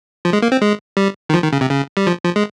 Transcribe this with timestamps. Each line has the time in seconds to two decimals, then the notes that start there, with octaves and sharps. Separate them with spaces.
0.25 F3
0.33 G#3
0.42 A#3
0.52 C4
0.62 G#3
0.97 G3
1.29 D#3
1.34 F3
1.43 D#3
1.53 C#3
1.61 C3
1.70 C#3
1.97 G3
2.07 F3
2.24 F3
2.36 G#3